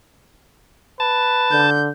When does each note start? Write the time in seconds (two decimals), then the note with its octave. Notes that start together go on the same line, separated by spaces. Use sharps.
1.00 B4 A5
1.51 D3 G6